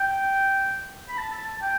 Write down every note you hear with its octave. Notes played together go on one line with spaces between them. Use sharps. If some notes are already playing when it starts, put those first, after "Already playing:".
Already playing: G5
B5
A5
A5
A5
G5